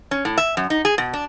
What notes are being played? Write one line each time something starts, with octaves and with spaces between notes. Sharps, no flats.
C#4
A2
E5
F#2
D#4
G#4
B2
D4